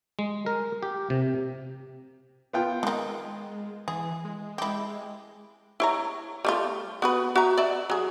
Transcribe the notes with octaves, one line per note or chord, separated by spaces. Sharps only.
G#3
A#4
G4
C3
B3 F4 G5
D3 D#3 G#3
E3 G#4
G#3
E4 G4
E4 C#5 A#5
G3 A3 F4
B3 F#4 B4
F#4 E5 A#5
D5 E5
F#3 G#4